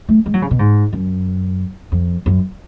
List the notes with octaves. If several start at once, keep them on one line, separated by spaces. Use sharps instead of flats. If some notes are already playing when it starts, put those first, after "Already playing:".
A3
G#3
F#3
C#3
B2
G#2
F#2
F2
F#2